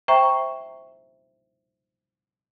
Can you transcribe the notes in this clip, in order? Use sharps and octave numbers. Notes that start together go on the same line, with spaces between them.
C5 E5 G5 A#5 C#6